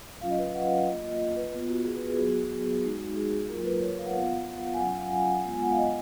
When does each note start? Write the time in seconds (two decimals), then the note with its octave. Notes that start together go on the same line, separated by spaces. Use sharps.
0.21 F#3 C#4 F4 F5
0.30 D#5
0.38 B4
0.46 F5
0.54 F#5
0.87 A#3 F4 D#5
1.36 B4
1.52 B3 F4
1.69 F#4
1.85 G#4
1.96 B4
2.07 G#4
2.18 F#3 B3 F#4 G#4
2.34 F#4
2.44 G#4
2.52 F#4
2.84 G#3 D#4 F#4
3.11 F#4
3.16 G#4
3.32 G#4
3.49 F#3 A#3 F4 A#4
3.65 B4
3.81 C#5
3.98 F5
4.06 F#5
4.13 B3 F4 F5
4.74 G#5
4.79 F#3 C#4 F4 F#5
4.97 F5
5.13 G#5
5.29 F#5
5.44 G#3 B3 F4 G#5
5.62 F#5
5.71 F5
5.77 D#5